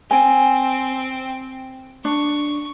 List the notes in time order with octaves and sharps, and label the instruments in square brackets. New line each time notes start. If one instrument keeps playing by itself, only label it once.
[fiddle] C4 [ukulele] G#5
[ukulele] D4 [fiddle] C#6